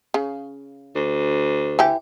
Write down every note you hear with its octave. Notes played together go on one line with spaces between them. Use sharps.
C#3
D2
E3 G4